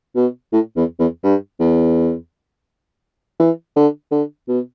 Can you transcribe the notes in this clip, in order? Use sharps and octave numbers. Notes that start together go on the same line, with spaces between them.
B2
A2
E2
E2
G2
E2
E3
D3
D3
B2